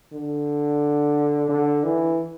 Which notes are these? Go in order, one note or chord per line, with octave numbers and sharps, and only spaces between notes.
D3
D3
E3